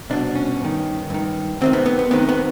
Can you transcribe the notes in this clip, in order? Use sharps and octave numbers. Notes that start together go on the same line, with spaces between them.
C2 B2 D4
C#4
G2 D#3
G2 D#3
C2 C3 D#3 C4
B3
B3
B3
C2 C3 D#3 B3
B3